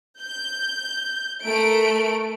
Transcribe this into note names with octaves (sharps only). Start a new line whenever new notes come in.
G6
A3 A#4 D7